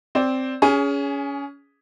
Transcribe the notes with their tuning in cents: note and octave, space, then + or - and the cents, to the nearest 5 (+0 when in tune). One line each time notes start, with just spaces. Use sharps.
C4 +0 D5 -15
C#4 +25 G#4 +0